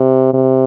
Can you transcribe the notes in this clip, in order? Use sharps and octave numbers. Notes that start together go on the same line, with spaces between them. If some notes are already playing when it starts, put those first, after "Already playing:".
Already playing: C3
C3